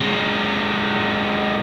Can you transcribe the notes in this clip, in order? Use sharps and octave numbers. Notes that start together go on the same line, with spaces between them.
C3 G#3